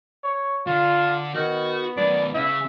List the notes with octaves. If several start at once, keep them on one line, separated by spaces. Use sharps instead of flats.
C#5
D3 F4
D#3 B3 F#4
B1 D#3 D5
C#3 E5